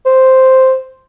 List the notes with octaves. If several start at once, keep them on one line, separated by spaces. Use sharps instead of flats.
C5